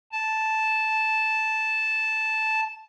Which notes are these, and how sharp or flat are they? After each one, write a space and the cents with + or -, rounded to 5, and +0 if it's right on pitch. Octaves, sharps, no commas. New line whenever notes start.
A5 -5